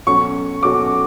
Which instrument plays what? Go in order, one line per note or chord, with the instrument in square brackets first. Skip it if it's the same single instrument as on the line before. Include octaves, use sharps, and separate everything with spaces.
[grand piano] B2 F#3 C#4 F#4 A4 [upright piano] C#6
[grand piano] B2 F#3 C#4 F#4 A4 [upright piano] D6